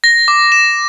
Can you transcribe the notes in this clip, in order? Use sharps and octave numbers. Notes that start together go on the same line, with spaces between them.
A#6
D6
E7